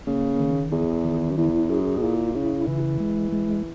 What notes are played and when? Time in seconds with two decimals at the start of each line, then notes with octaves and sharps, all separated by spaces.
0.07 C#3 A#3
0.40 D#3
0.72 E2 G#4
1.05 D#3
1.31 F#2
1.37 E2 E4
1.69 F#2 G#4
1.98 B2
2.02 A#2 E4
2.35 C#3 E4
2.67 C#3 E3
3.00 G#3
3.32 G#3